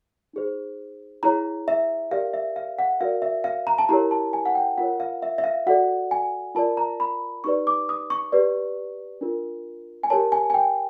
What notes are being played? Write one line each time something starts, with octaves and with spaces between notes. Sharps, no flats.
D#4 G#4 C5
E4 G#4 C#5 A#5
E5
G4 A#4 D5 F5
E5
F5
F#5
F#4 A#4 D5 F5
E5
F5
A#5
A5
E4 G4 A#4 C#5 A#5
A5
G#5
F#5
G5
F4 A#4 C#5 F#5
F5
E5
E5
F5
F#4 A4 D5 F#5
G#5
F4 A#4 D5 A5
A#5
B5
D#4 G4 B4 D5 C#6
D6
D#6
C#6
G4 B4 D5
D4 F4 A#4
G#5
G4 A#4 C#5 A5
G#5
G#5
G5